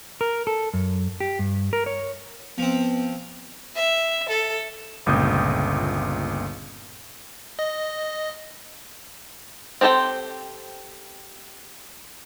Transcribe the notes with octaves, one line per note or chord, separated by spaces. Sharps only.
A#4
A4
F#2
G4
G2
A#4
C#5
F3 B3 C4
E5
A4
G1 C#2 A#2 D#6 G6
D#5
C4 G4 A4 C5 G5